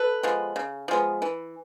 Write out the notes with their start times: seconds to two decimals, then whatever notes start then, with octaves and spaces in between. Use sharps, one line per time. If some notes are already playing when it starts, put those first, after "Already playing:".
Already playing: A4 B4
0.23 F3 G#3 B3
0.56 C#3
0.88 F3 G#3 B3
1.22 E3